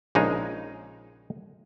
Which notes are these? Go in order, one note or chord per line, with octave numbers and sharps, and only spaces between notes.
A#1 C#3 G#3 D#4